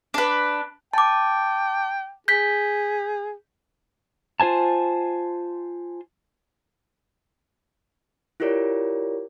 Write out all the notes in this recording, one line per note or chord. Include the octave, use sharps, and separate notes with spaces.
D4 B4
G5 A5 D6
G#4 G6 B6
F4 C5 G#5 A5
E4 F4 G4 A#4 C#5 D5